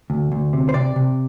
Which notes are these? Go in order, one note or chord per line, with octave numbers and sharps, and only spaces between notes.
D2
D2
C3
C5
C3 D5
C3